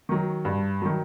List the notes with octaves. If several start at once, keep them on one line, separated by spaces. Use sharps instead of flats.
D#3 F#3
G2
D#3 F#3